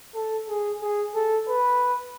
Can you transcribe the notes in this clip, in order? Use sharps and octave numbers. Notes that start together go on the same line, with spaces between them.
A4
G#4
G#4
A4
B4